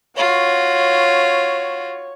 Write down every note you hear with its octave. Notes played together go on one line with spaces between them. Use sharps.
F4 F#4 C#5